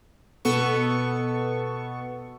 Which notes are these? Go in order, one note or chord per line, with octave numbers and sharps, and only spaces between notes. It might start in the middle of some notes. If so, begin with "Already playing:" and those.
B2 B3 A4 C#6